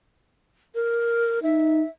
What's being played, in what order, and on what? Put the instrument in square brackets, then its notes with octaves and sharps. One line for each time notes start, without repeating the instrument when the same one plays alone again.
[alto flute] A#4
[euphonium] D#4 [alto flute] E5